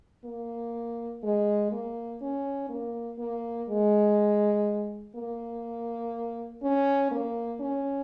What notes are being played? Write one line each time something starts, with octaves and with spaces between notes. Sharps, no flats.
A#3
G#3
A#3
C#4
A#3
A#3
G#3
A#3
C#4
A#3
C#4